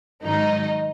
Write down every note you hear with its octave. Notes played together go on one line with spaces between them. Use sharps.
G#2 D#3 F#3 D#4